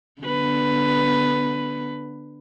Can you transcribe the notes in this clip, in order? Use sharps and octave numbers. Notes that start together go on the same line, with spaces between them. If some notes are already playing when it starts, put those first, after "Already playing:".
D3 B3 B4